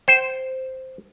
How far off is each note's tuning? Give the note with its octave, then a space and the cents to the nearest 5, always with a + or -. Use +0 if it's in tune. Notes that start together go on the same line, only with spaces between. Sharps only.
C5 +0 G5 -30